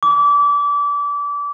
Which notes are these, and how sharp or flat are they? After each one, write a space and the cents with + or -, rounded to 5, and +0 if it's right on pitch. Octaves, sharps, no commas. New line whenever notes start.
D6 -30